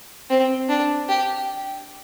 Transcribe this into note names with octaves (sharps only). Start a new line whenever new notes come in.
C4
D4
G4